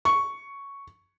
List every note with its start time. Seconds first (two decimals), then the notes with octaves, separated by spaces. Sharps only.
0.05 C#6